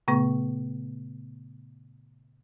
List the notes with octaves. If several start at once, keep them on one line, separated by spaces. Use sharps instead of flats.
A#2 C#3 A3 B3 C#6